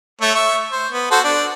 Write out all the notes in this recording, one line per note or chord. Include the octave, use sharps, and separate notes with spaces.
A3 C#5 E5
E5 C#6
C5
B3
F#4 A4 C5
D4